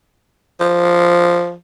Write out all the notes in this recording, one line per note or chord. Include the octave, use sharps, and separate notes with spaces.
F3